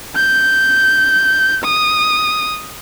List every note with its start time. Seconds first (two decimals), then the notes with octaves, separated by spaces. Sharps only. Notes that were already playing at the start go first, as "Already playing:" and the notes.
0.16 G6
1.64 D#6